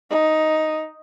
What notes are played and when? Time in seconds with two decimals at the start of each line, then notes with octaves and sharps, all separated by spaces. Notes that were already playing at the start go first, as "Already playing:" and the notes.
0.10 D#4